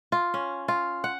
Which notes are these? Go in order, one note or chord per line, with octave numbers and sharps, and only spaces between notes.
F4
C#4
F4
F#5